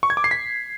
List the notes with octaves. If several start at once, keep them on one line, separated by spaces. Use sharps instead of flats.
C#6
G#6
D6
C7
B6